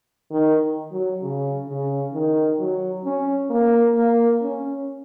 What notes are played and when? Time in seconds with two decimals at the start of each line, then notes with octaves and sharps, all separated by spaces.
0.31 D#3
0.92 F#3
1.22 C#3
1.68 C#3
2.14 D#3
2.59 F#3
3.04 C#4
3.50 A#3
3.96 A#3
4.41 C#4